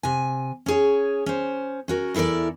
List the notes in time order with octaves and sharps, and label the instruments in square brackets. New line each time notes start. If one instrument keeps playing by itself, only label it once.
[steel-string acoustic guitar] C3 G#5
C#4 G#4 C#5
C#4 C5
C#4 F#4 A#4
E2 E4 A4 A#4 D5